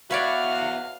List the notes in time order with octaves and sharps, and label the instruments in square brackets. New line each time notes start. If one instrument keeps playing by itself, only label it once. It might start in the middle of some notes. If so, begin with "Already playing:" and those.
[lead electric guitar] B3 E5 [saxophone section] F#4 [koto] B4 C#5 D5 [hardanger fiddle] F5